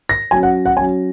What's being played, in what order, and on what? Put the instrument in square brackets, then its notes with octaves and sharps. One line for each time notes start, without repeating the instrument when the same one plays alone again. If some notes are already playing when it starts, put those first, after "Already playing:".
[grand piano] A#6
F#3 C#4 G#5
F#5
F#5
C#4 G#5
F#3